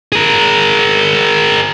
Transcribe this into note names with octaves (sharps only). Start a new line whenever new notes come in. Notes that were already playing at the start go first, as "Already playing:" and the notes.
G#4 A#4